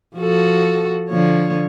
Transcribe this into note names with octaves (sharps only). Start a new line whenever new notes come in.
F3 F#4 A4
D3 F3 C#5